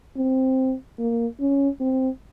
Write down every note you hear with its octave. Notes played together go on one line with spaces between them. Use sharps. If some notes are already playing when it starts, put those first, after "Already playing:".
C4
A#3
C#4
C4